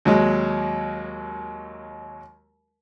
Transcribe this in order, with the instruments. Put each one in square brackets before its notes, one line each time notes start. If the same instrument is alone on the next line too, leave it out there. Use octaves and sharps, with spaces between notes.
[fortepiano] D#2 F#3 G#3